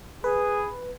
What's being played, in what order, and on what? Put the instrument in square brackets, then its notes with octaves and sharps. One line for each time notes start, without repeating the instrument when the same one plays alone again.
[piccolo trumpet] G#4 [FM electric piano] B4